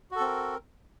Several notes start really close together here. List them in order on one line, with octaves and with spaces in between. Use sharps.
F#4 A4 C4 A#4